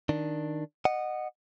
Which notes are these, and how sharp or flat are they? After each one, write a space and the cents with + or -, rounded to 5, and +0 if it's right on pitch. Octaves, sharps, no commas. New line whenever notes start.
D#3 +0 D4 +5
D#5 -20 F#5 +0